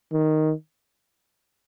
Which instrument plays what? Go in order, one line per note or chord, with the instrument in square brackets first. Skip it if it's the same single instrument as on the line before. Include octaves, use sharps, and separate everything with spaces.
[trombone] D#3